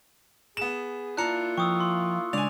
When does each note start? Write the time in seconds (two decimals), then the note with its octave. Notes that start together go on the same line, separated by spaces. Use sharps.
0.57 B3 G#4 E7
1.17 A#3 D4 E4 F4 A5 A#5 F#6 C#7
1.58 F3 G5 C#6 D#6 E6
1.80 C6
2.33 C#3 G#3 D4 D5 G#5 F7